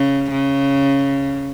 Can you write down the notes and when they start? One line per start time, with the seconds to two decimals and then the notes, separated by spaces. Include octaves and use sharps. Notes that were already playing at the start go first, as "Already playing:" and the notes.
Already playing: C#3
0.31 C#3